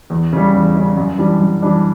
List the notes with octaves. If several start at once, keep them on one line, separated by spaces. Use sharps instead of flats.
E2
C#3 G3
E2
C#3 G3
F#2
E3 G3 D4
F#2
E3 G3 D4